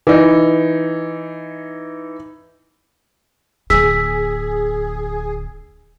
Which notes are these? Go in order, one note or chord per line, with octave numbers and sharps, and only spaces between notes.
E3 D#4
D1 D3 G#4 E6 B6